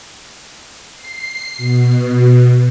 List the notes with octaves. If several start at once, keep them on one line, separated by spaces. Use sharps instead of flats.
C7
B2